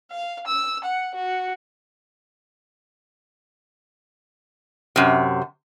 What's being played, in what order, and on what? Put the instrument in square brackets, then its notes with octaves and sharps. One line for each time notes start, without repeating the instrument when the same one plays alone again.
[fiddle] F5
E6
F#5
F#4
[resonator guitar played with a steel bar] F#2 C3